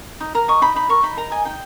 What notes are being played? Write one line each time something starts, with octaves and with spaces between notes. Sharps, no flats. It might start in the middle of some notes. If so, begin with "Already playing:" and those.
D#4
A#4 A#5
D#5 C#6
D#4 B5
D#4 B5
A#4 C#6
D#4 B5
A#4 A#5
D#5 G#5
D#4 G5